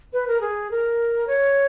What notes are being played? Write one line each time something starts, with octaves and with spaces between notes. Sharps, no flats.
B4
A#4
G#4
A#4
C#5